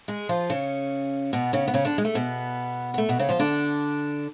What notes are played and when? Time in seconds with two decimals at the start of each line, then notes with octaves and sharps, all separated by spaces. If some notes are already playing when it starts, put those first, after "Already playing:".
0.08 G#3 G#4
0.29 F3 F4
0.50 C#3 C#4
1.33 B2 B3
1.53 C#3 C#4
1.68 B3
1.74 C#3 C#4
1.85 D3 D4
1.98 G#3
2.05 A3
2.15 B2 B3
2.94 B3
2.98 A3
3.09 B2 B3
3.19 C#3 C#4
3.29 F3 F4
3.39 D3 D4